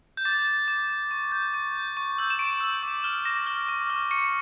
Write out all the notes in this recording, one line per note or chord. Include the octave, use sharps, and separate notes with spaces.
G6
D6 A6
G6
D6
G6
C#6
G6
C#6
G6
C#6
E6 G6
E7
C#6 D7
E6 G6
D6
F6
D6 A#6
F6
C#6
F6
C#6 C#7